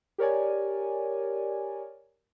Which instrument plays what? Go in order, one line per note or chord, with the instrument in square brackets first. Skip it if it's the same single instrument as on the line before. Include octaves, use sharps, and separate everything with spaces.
[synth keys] G4 A#4 C#5 D5 G#5